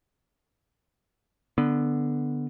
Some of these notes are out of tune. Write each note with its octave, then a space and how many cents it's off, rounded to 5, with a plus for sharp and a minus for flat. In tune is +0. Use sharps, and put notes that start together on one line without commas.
D3 +5 B3 +0